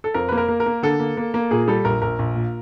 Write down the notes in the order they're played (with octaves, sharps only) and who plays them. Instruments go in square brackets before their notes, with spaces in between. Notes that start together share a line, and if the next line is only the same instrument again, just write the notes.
[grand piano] A4
F2 A#4
A#3 B4
A#4
A#3
A#4
A#3
D3 A4
A#3
A#3
A#3
A#2 G#4
G3 A4
A#1 A#4
A#1 A#4
A#1
A#2